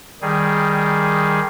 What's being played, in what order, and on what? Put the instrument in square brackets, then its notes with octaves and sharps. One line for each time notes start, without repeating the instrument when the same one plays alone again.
[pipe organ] D#3 G3 G#4